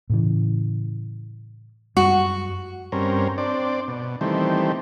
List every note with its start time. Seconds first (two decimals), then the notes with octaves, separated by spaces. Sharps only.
0.10 A2 C#3 E3
1.97 F#2 G3 G#3 F#4
2.92 G2 C4 C#4 A#4
3.38 C4 D4 D5
3.88 B2
4.21 D#3 E3 G3 A3 C4